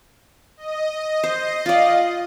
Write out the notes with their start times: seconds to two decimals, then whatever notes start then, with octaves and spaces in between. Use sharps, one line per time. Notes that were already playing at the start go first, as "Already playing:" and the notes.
0.57 D#5
1.24 C5
1.66 F4 D5 F5